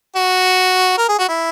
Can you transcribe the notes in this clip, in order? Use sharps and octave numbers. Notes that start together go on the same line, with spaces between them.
F#4
A#4
G#4
F#4
E4